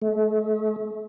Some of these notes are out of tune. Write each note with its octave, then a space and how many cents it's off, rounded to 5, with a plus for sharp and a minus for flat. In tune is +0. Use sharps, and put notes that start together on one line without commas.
A3 -40